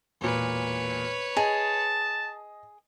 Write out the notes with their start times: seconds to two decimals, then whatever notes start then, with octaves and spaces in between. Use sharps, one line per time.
0.21 E1 A#2 B4 C#5
1.37 G#4 D#5 A5